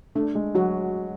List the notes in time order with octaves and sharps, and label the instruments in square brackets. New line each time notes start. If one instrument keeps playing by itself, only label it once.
[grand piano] A3 [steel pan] D4
[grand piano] G#3
[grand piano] F#3 [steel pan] F#4